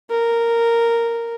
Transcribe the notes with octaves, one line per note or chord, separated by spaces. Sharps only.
A#4